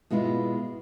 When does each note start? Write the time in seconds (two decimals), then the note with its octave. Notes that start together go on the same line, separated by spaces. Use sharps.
0.10 B2 G#3 B3 E4 F4